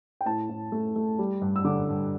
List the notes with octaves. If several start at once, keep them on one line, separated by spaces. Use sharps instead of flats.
G5
A2 A5
A2
A3
A3
G3
G2
E6
D3 D6
G2